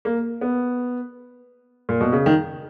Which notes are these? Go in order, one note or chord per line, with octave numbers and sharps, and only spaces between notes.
A#3
B3
A#2
B2
C#3
D#3